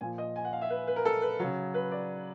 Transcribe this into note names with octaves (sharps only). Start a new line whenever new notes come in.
A#2 F3 G#5
D#5
G#5
F#5
F5
E5
B4
B4
A#4
A4
B4
C#3 F#3
B4
D5